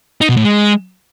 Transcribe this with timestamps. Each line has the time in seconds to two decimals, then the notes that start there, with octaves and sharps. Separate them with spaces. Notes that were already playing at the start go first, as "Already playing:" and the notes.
0.21 D#4
0.29 B2
0.37 A2
0.44 G#3